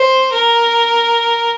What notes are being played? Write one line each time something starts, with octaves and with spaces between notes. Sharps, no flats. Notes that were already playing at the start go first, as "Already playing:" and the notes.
Already playing: C5
A#4